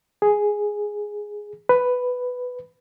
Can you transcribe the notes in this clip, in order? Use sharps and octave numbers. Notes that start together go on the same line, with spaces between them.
G#4
B4